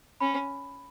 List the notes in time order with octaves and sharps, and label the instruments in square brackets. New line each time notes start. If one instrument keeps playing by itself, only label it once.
[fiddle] C#4 [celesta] B5